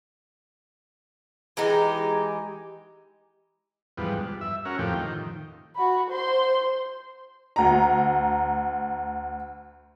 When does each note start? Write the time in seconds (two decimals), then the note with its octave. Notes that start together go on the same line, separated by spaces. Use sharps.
1.57 E3 G#3 D#4 G4
3.97 E2 G#2 F3 G3 B3
4.18 G2
4.41 E5
4.65 C#4 F#4 A#4
4.79 F2 A2 F3 G4
4.96 D#3
5.76 F#4 B5
6.10 C5 C6
7.56 D2 A#5